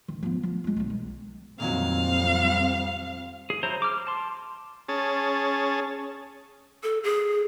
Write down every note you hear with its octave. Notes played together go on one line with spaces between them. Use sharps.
D#3
F3 B3
F3
G#3 F4
B1 D3
D#3
F2 A#2 D#3 F#3 G3 C4 F5
G#4
F#3 E4 C5 A#5
D6 F6
A5 C6
C#4 G#4 A5
A4
G#4